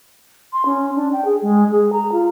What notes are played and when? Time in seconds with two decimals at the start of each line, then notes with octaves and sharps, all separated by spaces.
0.53 C6
0.66 C#4
0.96 D4
1.13 G5
1.25 G#4
1.42 G#3
1.71 G#4
1.92 A#5
2.12 F4